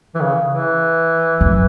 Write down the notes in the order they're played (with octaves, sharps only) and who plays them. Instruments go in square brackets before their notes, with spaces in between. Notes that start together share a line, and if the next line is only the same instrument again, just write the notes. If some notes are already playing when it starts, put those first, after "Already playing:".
[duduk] E3
C#3
E3
[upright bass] F#2